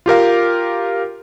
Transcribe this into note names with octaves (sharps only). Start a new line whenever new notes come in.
F4 G4 A#4 F5